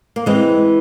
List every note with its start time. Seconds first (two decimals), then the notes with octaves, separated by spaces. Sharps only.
0.16 A#3
0.26 E3 G#3 C4